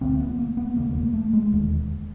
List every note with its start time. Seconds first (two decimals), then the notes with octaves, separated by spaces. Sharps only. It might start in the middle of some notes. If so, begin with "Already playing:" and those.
0.01 D2 D3 C4
0.20 B3
0.38 A#3
0.57 B3
0.76 E1 D#2 C#3 A#3
0.95 A#3
1.14 A3
1.33 G#3
1.52 E1 D#2 D3